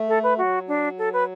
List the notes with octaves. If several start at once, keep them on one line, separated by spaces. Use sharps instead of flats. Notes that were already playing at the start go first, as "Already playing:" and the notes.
Already playing: A3
A4
B4
F#3 F#4
D4
A4
B4